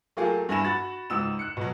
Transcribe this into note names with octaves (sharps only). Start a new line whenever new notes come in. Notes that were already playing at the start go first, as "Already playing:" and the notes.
F#3 A3 A#3 F4 G4 G#4
G2 E4 G#5 B5 A#6 E7
F#4 B5 A6
C#2 G#2 D#6 E6 E7
F#6 C#7
B2 F#3